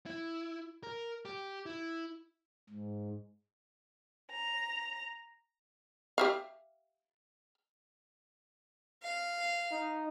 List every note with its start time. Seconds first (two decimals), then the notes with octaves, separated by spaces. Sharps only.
0.06 E4
0.83 A#4
1.25 G4
1.66 E4
2.69 G#2
4.31 A#5
6.18 G4 E5 F5
9.03 F5
9.71 D#4